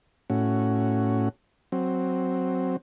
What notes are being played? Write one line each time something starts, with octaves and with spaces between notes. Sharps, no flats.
A2 C#4 F#4
F#3 C4